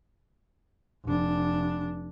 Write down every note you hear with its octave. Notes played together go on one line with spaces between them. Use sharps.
F1 D4